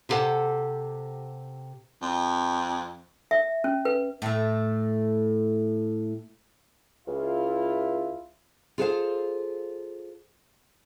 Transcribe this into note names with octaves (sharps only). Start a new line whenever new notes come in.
C3 E4 G4 A4 F#5
F2
E5
C#4
B4
A2 A3
C#2 E4 F4
F4 G#4 A4 B4 C5 F5